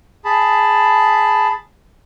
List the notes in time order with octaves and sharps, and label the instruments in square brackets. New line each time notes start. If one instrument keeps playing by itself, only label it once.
[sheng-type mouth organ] G#4 A5 B5